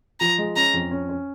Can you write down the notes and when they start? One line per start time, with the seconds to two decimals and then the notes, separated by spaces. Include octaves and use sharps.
0.20 F3 A#5
0.38 G#3
0.56 C#4 A#5
0.74 F2
0.91 C#4
1.09 C#4